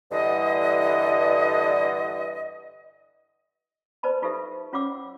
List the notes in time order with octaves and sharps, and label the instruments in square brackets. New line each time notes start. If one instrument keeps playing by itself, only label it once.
[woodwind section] G2 D3 E3 D#5
[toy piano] B4 C5 D5 A5 B5
D#4 F4 G4 A4 B4 E5
C#4 F4 C#5 F#5 D6 E6